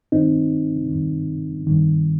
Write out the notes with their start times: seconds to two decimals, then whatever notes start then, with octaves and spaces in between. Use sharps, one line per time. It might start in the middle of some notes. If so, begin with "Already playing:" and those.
0.12 G2 D#3 C4 D#4
0.90 G2 D#3
1.67 G2 D#3